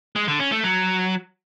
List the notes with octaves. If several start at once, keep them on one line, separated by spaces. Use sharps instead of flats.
G#3
D3
C#4
A3
F#3